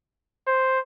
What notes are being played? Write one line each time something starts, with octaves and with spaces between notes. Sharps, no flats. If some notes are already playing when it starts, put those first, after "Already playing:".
C5